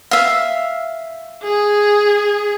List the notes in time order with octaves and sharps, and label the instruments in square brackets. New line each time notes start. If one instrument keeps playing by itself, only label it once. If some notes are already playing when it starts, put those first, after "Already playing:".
[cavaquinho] E5 F5
[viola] G#4